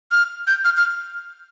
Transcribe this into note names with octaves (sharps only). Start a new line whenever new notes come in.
F6
G6
F6
F6